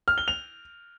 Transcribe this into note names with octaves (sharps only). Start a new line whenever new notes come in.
F6
G7
F7